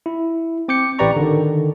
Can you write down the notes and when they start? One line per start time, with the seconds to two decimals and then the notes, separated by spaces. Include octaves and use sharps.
0.06 E4
0.68 C4 D6 G6 C#7
0.99 A1 G4 B4 D5 A#5 C#6
1.16 D3 D#3